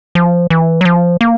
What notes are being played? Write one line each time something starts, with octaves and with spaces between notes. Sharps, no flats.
F3
E3
F#3
F3
A#3